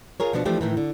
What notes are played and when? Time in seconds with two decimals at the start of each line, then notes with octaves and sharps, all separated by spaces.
0.20 F4 G#4 A#4 C#5
0.33 B2 F3 B3 D4 F#4
0.45 E3 F3 A3 D4 G4
0.61 A2 D#3 E3
0.77 D3